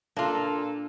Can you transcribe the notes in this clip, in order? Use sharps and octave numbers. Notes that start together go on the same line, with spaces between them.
A#2 A#3 D4 F4 A4